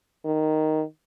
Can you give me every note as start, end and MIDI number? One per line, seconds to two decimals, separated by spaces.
0.25 0.83 51